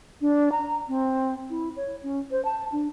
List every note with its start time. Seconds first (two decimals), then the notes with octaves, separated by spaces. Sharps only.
0.21 D4
0.52 A#5
0.88 C4
1.50 E4
1.76 C#5
2.03 C#4
2.31 C5
2.45 A5
2.72 D4